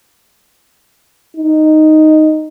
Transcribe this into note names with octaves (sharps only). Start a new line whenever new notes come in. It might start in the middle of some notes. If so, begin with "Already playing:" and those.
D#4